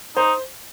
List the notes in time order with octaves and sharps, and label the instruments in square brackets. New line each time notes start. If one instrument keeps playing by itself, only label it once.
[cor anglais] D#4 [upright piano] C5